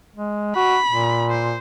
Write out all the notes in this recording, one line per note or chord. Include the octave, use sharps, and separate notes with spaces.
G#3
F#4 B5
A#2
C5